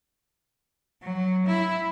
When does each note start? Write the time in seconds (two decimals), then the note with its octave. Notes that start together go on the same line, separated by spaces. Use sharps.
1.03 F#3
1.46 E4